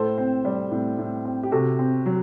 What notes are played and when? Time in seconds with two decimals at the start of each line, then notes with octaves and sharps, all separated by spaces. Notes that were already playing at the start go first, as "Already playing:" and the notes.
Already playing: A2 A4 C5
0.18 C4
0.45 G3
0.71 A2
0.98 A2
1.25 C4
1.43 G4
1.52 C3 F#4 A4
1.79 C4
2.06 F#3